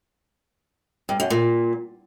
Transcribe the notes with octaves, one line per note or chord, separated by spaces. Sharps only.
G2
F#2
A#2